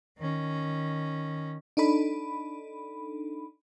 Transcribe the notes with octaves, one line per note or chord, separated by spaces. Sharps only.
D#3 C#4
D4 D#4 A4 B5